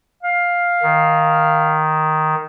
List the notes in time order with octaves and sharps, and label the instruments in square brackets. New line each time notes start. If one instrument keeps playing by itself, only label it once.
[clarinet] F5
[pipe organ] D#3